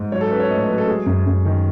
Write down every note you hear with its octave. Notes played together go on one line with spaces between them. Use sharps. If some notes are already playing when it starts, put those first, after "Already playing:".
Already playing: G#2
F#3 C#5
A4
C#4 B4
C#5
A2 D#5
C#5
F#3 B4
A4
G#3 G#4
F#2
F#2
D#3